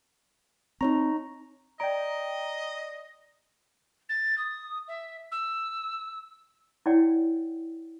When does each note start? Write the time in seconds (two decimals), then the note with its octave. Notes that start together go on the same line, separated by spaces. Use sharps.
0.81 C4 D#4 C#5 A#5 C#6
1.80 D5 D#5 G5 A#5 D7
4.09 A6
4.37 D#6
4.87 E5
5.31 E6
6.86 E4 C#5 D5 F#5 G5